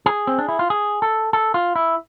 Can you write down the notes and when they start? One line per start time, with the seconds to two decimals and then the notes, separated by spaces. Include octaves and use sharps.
0.06 G#4
0.27 C4
0.38 D4
0.48 E4
0.59 F4
0.70 G#4
1.02 A4
1.33 A4
1.54 F4
1.76 E4